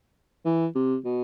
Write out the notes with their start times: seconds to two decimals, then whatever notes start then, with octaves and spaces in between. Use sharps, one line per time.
0.45 E3
0.75 C3
1.05 B2